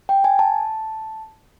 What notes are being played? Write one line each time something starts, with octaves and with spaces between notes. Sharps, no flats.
G5
G#5
A5